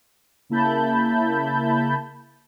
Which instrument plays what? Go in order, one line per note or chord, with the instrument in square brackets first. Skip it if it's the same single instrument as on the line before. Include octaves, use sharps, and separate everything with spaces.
[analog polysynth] C#3 A#3 E4 A5 B5 G6